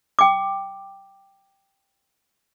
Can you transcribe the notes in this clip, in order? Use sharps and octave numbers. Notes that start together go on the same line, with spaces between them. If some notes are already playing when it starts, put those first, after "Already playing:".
G5 D6